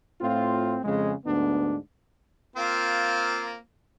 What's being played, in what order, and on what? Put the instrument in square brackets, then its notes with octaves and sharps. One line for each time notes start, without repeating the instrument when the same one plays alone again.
[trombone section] A2 C4 F4
F2 C#3 G#3
D2 G#2 B3 D4
[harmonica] A#3 C4 F4